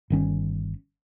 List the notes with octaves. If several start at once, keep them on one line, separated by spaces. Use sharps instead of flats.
G1 D#3 C#4